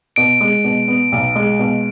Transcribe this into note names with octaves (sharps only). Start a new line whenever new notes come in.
B2 D7
G#3
B2
B3
B1
G#3
B2